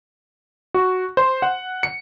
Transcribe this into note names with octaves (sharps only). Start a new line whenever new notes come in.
F#4
C5
F#5
C#7